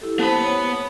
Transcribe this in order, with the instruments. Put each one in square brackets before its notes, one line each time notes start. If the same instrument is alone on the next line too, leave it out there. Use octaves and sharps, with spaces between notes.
[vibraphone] E4 G4 A4
[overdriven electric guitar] B3 B5 [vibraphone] C5 A5
[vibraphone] C#5